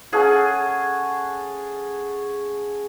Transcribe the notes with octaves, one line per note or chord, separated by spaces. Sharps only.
C#4 G#4 A4 F#5